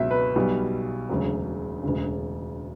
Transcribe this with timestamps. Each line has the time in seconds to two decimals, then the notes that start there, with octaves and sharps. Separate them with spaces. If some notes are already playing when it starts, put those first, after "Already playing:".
Already playing: C#2 B2 F#3 E5
0.11 B4
0.36 B1 B2 G3
1.09 E1 D2 C#3 F#3
1.83 E1 D2 C#3